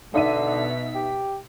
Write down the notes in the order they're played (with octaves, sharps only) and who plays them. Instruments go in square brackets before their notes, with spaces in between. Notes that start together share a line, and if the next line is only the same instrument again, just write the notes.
[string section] B2 B6 [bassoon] D3 [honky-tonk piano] D#4 E5 D#7
[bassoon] G4